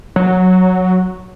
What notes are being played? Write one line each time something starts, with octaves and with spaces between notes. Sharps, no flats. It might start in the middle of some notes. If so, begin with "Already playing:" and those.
F#3